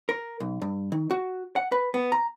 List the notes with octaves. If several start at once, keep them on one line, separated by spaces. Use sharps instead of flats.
A#4
B1
G2
D#3
F#4
F#5
B4
B3
A#5